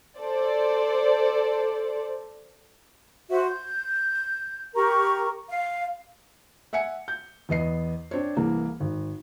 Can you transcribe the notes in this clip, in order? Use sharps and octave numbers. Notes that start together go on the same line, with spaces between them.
A4 C5 D5
F#4 C5 E5
G6
G4 A#4 A#5 C#6
F5
E5 F#5 G#5 C#7
G6
E2 B3 D#5 C7
C4 D4 C5 C#5
C2 E3 A#3 G#4
G#1